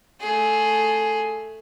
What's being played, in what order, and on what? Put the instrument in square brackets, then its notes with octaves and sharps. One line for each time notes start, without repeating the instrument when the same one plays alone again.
[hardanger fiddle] A3 G#4